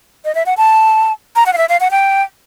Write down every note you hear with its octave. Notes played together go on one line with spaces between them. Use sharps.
D#5
E5
F#5
A5
A#5
F#5
F5
E5
F5
F#5
G5